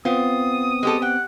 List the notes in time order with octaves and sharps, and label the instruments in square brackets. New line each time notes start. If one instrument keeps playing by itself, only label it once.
[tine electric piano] B3 C4 [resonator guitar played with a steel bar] F4 [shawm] D#6
[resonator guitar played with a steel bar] G#3 G4 A4
[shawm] F#5 [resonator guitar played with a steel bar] G5